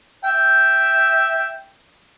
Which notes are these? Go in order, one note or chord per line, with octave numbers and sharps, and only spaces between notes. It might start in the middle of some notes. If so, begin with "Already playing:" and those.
E5 G5